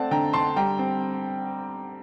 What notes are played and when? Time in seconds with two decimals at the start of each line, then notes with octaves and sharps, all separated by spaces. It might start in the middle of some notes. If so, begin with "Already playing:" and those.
Already playing: A3 C4 D5 F#5 A5
0.11 D3 G5 A#5
0.33 D3 A5 C6
0.56 G3 G5 A#5
0.79 C4